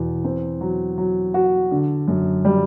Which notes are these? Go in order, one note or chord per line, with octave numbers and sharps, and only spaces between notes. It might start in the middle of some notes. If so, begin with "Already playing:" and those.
Already playing: E2 B2
C4
F#3
F#3
F#4
D3
F#2
G3